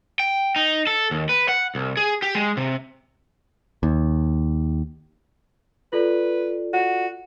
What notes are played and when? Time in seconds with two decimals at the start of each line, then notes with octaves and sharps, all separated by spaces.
0.19 G5
0.56 D#4
0.87 A4
1.11 D#2
1.29 B4
1.49 F#5
1.75 C2
1.97 G#4
2.22 G4
2.35 G#3
2.57 C3
3.83 D#2
5.93 F4 A4 B4 D5
6.73 F#4